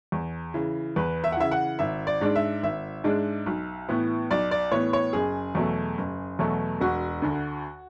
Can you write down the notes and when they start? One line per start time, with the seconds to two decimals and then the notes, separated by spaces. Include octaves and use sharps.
0.12 E2
0.54 C#3 E3
0.96 E2 B4
1.24 E5
1.32 F#5
1.37 C#3 E3 E5
1.51 F#5
1.79 G#1 E5
2.07 D5
2.21 G#2 G#3 D4
2.35 E5
2.63 G#1 E5
3.04 G#2 G#3 D4
3.46 B1
3.89 A2 E3 B3
4.31 B1 D5
4.51 D5
4.71 A2 E3 B3 C#5
4.93 C#5
5.13 F#1 G#4
5.55 E2 B2 F#3 A3
5.98 F#1
6.39 E2 B2 F#3 A3
6.81 E1 F#4
7.22 D2 D3